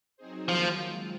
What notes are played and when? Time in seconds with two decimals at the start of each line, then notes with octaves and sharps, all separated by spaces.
0.17 F#3 C4 D#4 G#4 C5
0.48 D#3 F3 F#3 A#3
0.79 G#3 C4 F4